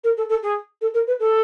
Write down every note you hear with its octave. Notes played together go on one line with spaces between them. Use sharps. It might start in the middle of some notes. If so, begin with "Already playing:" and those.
A#4
A4
A4
G#4
A4
A#4
B4
A4